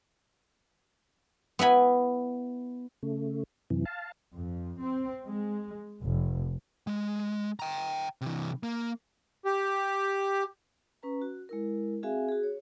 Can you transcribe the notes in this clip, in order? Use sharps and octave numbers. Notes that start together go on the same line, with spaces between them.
B3 E4 G#5 B5
C#3 A3
F#2 C3 E3
F5 A5
F2
C4
G#3
F1
G#3
G5 A#5
C3 E3
A#3
G4
C#4 B4 A#5
F#4
G#3 E4 A#4
C4 F#4 G#4 E5 F5 G#5
F#4 G#4
C#5